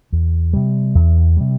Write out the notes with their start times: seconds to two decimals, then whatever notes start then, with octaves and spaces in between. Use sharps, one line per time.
0.12 E2
0.53 C3 G3
0.95 E2
1.37 C3 G3